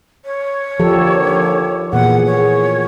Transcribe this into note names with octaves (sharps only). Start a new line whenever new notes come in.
C#5
D#2 D3 F3 G4 A4
A#2 E3 B3 G#4 F#5
C#5